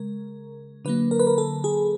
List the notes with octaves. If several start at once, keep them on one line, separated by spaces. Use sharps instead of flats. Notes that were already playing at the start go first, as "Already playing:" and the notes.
Already playing: C#3 G#3 A#4
D3 F#3 A#3 B4
A#4
B4
A#4
A4
G#4